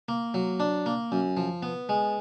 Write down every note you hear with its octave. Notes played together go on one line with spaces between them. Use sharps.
A#3
F#3
D4
A#3
F#2
F3
B3
G#3